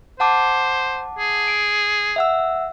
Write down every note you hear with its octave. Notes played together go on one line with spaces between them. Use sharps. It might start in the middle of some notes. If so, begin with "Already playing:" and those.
C5 F#5 A5 D6
G#4
D7
E5 F#5 E6